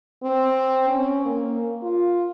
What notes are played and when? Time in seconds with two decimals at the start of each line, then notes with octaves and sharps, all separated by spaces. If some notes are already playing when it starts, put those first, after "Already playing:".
0.23 C4
0.88 C#4
1.25 A#3
1.83 F4